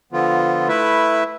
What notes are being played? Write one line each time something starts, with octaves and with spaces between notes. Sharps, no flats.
D3 F3 B3 F4
A3 E4 B4 E5